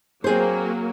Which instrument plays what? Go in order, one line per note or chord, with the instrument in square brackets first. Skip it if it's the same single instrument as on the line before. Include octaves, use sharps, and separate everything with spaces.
[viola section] F#3 A#3 [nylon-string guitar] C4 G#4 C5